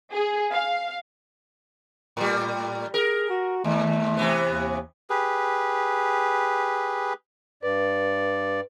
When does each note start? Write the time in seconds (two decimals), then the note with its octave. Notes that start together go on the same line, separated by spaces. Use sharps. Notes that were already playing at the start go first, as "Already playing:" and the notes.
0.12 G#4
0.52 F5
2.17 A2 G3
2.94 G#4 A#4
3.30 F#4
3.64 D#2 A3
4.17 C3 E3 B3
4.48 D#2
5.10 G4 G#4 B4
7.63 G2 B4 D5